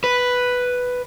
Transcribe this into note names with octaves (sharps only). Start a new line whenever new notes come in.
B4